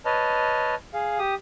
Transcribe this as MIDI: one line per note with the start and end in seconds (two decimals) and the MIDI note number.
0.05 0.75 71
0.05 0.75 73
0.05 0.75 75
0.05 0.75 81
0.05 0.75 89
0.94 1.18 68
0.94 1.18 77
1.19 1.34 67
1.19 1.34 87